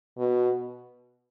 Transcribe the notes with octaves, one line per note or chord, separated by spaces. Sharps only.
B2